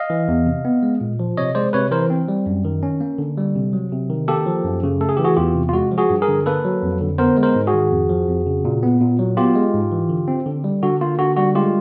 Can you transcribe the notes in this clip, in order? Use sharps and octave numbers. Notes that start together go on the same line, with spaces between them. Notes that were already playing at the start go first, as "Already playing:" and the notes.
Already playing: D#5 F5
E3
E2
C3
B3
G#3
A#2
F3
C3 C#5 D#5
G#3 C5 D5
C3 B4 C#5
E3 A#4 C5
C4
G3
F#2
D#3
C#4
A#3
D3
G3
C3
F#3
C3
D#3
A#3 G4 A4
F3
F#2
C#3
A3 A4
G#4
E3 G4
F#4 G#4
E2 F4 G4
C3
F4
G#3 F#4
F3
F#4 G#4
G2
G#4 A#4
D3
A#3 A4 B4
F#3
F2
D3
B3 A#4 C5
G#3
A#4 C5
G#2
F#4 G#4
D#3
F2
F3
F2
C#3
A#2
B3
A#2
F#3
B3 F4 G4
G#3
G#2
E3
D3
C4
D3
G3
D3 F#4
A#3 F4
D3 F#4
G3 F#4
G#3 F4 G4